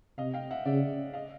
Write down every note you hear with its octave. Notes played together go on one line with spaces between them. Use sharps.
C3 D#5 F5
F5 G5
E5 F#5
C#3 D5 E5
D#5 F5